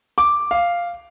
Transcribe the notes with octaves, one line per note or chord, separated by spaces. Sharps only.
D6
F5